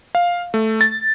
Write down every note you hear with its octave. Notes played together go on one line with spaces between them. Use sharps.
F5
A3
A6